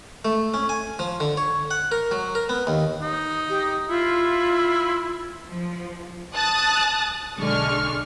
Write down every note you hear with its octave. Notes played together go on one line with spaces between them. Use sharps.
A3
C#4
G#5
F3
D3
C#5
F#5
A#4
F#3
A#4
B3
D#2
D#4
G4
E4 F4
F3
A5 D#6 F#6 A6
B1 D3 G#3 D4 C#6 F6